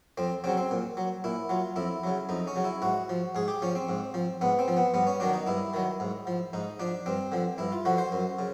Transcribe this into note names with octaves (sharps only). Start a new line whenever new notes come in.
F2 C4
C#3 F#3 C4
C4
A#2
F#3
A#2 E4
F#3 F4
F2 E4
C#3 F#3
F2 D#4
C#4
C#3 F#3
E4
G#2 F#4
F3
G#2 G#4
G4
F3 C#4
C4
G#2
F3
G#2 B3
C4
F3
B3
G2 B3
C#4
D#3 F#3 D4
D#4
G2 E4
D#3 F#3
G#2
F3
G#2 D#4
F3 D4
G2 C4
D3 F3
G2 E4
F4
D3 F3 F#4
C5
F#2
C#3